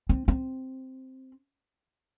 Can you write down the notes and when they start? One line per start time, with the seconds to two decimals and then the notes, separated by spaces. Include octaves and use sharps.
0.09 C4
0.28 C4